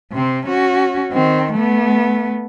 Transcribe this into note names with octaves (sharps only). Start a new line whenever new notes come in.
C3 C4
C#4 F#4
D#3 C4
A3 B3